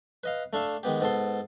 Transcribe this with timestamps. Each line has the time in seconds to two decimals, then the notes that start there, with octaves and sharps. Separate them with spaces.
0.24 B4 D#5 F5
0.53 A3 D4 E5 F5
0.83 D#3 G#3 B3 G4
1.00 G#2 B3 A4 C6